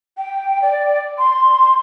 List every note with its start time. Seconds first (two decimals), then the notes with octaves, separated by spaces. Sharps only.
0.17 G5
0.62 D5
1.18 C6